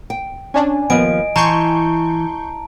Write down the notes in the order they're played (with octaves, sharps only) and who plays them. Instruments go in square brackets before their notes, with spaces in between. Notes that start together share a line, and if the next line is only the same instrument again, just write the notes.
[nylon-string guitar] G5
[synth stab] C#4 D4 [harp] G#5
[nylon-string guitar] D#2 F3 [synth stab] B3 [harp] D#5 G#5 [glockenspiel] D7
[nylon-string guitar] E3 [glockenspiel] A5 A#5 [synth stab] C6 C#6 G6